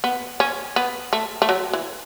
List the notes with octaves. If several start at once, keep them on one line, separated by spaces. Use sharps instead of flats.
B3
C#4
B3
A3
A3
F#3
E3